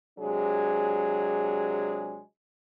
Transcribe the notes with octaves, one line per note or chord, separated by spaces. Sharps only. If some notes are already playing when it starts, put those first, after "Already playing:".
C3 F#3 G#3 D4 G#4